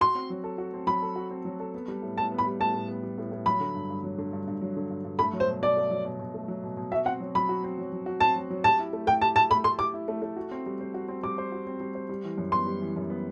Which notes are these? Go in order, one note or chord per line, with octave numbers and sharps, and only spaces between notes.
F#4 C6
C4
F#3
A4
F#4
C4
F#3 B5
A4
F#4
C4
F#3
A4
B3
G3
A2
A2 A5
B3
B5
G3
A2 A5
A2
B3
G3
A2
A2
F#3 B5
D3
G2
G2
F#3
D3
G2
G2
F#3
D3
G2
G2
A3 B5
F#3
C5
B2
B2 D5
A3
F#3
B2
B2
A3
F#3
B2
B2
F#4 E5
C4 F#5
F#3
F#3 B5
F#4
C4
F#3
F#3
F#4
C4 A5
F#3
F#3
G4 A5
E4
A3
A3 G5
G4 A5
E4 A5
A3 B5
A3 C6
G4 D6
E4
A3
A3
F#4
C4
G3
C5
F#4
C4
G3 D6
C5
F#4
C4
G3
C5
G3
E3
F#2
B3 C6
G3
E3
F#2
B3